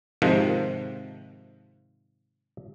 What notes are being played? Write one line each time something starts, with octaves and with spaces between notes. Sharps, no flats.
G#2 C3 D#3 F3